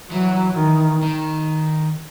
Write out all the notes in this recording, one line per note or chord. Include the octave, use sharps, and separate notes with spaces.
E3 F#3
D#3
D#3